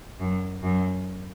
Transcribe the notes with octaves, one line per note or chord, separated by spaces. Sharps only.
F#2
F#2